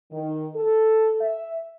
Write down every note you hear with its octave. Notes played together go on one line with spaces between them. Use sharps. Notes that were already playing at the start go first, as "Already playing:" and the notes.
D#3
A4
E5